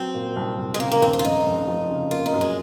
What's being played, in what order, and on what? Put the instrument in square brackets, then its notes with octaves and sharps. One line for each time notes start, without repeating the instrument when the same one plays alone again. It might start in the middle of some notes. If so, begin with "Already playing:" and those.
Already playing: [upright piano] F#3 [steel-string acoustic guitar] C4
[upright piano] A#2
C2
C2
[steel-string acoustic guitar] G#3
[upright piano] C#3 [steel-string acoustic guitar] A#3
[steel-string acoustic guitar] A#3
[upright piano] D#2 [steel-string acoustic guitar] C4
[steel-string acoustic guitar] C4
F4
[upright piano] F1 [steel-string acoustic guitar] D#4
[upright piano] F1
F3
C#3
[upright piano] A#3 [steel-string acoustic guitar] F4
[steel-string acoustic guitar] D#4
[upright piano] F#2
[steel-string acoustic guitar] G#3